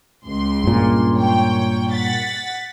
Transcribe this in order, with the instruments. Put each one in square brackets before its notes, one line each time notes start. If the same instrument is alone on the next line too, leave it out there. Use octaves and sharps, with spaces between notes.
[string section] C#2 C6
[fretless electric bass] G2 A#2
[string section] C#5 G5
F#5 A6 B6